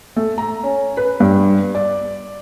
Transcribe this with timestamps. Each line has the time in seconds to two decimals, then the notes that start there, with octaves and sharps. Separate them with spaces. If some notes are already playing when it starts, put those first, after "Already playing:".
0.16 A3
0.38 A#5
0.64 C#4
0.97 B4
1.20 G2
1.75 D5